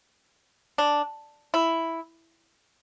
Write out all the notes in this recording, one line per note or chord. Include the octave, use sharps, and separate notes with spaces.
D4
E4